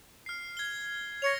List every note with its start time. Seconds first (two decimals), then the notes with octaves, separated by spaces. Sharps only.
0.26 F6 C7
0.57 G#6 G7
1.22 C#5 A#6 C#7 F7